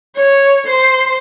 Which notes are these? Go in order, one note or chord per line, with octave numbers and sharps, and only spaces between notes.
C#5
C5